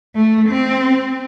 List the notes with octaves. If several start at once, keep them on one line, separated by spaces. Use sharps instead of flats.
A3
C4